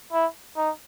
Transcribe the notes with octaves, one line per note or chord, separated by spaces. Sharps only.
E4
D#4